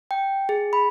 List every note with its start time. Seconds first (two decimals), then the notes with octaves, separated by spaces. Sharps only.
0.11 G5
0.49 G#4
0.73 B5